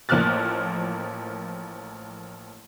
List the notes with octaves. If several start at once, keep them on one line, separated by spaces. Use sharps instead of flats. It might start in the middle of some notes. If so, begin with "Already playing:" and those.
A1 F3 A#3 F6 F#6 A6